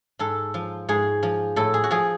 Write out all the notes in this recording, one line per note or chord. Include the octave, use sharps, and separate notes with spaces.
G#2 A4
F3
G#2 G#4
F3
A2 A4
G#4
F#4
F3 G#4